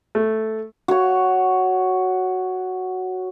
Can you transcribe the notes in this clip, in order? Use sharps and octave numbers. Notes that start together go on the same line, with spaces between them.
A3
F#4 C#5